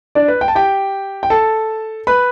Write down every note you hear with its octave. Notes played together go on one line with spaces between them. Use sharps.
D4 D5
B4
G5
A5
G4 G5
G5
A4 A5
B4 B5